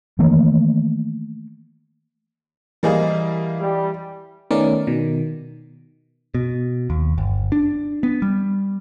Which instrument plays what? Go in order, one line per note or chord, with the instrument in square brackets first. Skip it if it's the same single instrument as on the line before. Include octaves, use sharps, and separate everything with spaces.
[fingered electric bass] D#3 E3 A3 A#3
[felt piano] E3 C5 D#5 [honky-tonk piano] G3 A#3 G#4
[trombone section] G3
[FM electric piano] D#3 A3 B3 C#4 A#4 D5
B2 D#3
[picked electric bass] B2
D#2
G1
D4
B3
G3